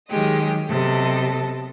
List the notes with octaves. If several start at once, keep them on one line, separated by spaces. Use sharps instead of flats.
D#3 F#3 G#3 G4 D#5
C3 F#3 B3 A4 D#5 A5